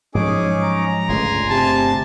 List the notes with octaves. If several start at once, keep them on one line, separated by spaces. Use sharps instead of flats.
G#2 F3 F#3 C#4 D#4 G#4 D6
A#5
G1 C#2 A#2 A3 G#5 C6
C3 A5